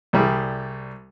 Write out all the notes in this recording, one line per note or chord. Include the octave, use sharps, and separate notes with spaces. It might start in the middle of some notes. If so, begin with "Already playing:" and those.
C2 G3 E4 G#4